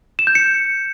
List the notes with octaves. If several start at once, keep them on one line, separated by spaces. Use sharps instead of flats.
E7
G6
C#7